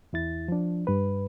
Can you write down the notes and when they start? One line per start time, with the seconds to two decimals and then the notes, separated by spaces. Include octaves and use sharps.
0.13 E2 E4 A6
0.48 F3 D4
0.87 G2 B4